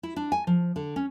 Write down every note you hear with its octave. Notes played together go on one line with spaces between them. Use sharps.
E4
D4
G#5
F3
D3
C#4